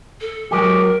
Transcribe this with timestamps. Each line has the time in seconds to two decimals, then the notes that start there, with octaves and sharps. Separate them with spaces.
0.21 A4
0.51 F#3 G#3 G4 A#4